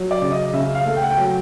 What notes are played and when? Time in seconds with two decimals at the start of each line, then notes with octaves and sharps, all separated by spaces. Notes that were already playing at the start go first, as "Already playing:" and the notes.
Already playing: F#3
0.11 D5
0.22 C#3
0.32 D#5
0.54 C#3 E5
0.75 F5
0.85 A3
0.96 G5
1.03 F#5
1.10 G5
1.17 F#3